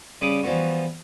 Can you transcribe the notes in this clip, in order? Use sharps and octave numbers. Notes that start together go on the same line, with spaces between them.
C#3 G3 B5 D6 D#6
E3 F3 G3 B3 F#4